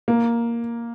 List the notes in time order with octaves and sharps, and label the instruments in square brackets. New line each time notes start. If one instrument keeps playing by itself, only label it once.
[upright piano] A#3